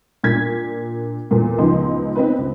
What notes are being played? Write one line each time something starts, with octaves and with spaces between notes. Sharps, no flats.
A#2 D4 G#6 B6
E2 A#2 A4
C#2 F3 B3 D#4 C6
C4 D#4 B4
C#2